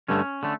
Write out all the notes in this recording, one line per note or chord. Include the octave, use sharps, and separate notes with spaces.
G2 D3 A3 C#4
D3 A3